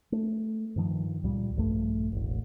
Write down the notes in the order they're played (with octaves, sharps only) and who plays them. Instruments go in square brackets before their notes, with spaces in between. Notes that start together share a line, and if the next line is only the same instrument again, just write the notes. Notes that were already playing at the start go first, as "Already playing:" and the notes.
[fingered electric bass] A3
G2 D#3 F3
C#2 A#2 G3
A#1 G2 A3
E1 A1